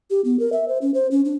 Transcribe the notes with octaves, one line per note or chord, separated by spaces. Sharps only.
G4
B3
A#4
E5
C5
C#4
C5
C#4
D4